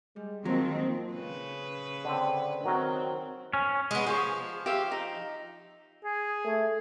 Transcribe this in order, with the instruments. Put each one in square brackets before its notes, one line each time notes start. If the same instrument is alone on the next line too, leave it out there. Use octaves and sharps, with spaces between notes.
[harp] G3 [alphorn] G#3
[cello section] D#3 C4 [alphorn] F3 [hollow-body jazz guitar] F#3 [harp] G#3 A#3 D#4
[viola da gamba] C#3 B4
[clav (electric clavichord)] D3 C4
[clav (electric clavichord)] D#3 F#3 A#4 [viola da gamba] C4
[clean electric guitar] C#4
[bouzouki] G#3 B3
[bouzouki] F3 [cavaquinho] G#4 C#5
[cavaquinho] G4 E5 F5
D#4
[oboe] G#4
[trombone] A3